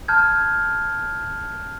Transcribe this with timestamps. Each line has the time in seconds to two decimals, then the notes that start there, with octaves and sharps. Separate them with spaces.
0.08 A5 F6 G6 G#6